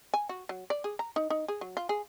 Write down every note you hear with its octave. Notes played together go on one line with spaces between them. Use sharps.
G#5
F#4
F#3
D5
G#4
A#5
D#4
D#4
G#4
F#3
F4
G#4